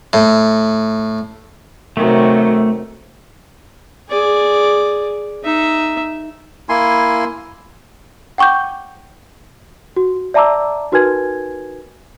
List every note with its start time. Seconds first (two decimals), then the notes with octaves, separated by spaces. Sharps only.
0.13 A2
1.97 C3 D#3 F#3 A3
4.09 G#4 D5
5.44 D#4 E5
6.69 A#3 E4 G#5 C6
8.38 F#5 G5 C#6 D6 G6
9.96 F#4
10.34 D5 E5 A5 A#5 D6 E6
10.92 D#4 F#4 A#4 B4 G#5 G#6